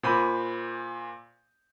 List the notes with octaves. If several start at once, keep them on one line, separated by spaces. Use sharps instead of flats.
A#2 C5 B5 D6 G6 D#7